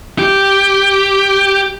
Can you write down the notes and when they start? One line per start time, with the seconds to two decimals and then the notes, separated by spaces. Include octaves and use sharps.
0.19 G4